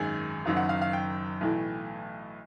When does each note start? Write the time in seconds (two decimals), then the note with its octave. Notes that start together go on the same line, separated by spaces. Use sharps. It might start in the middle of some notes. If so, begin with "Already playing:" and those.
Already playing: G#1 F#2 D#3 G#3 G#5
0.45 F#1 F#2 D#3 F#3 F5
0.57 F#5
0.69 F5
0.82 F5
0.93 G5
1.41 B1 A2 E3 A3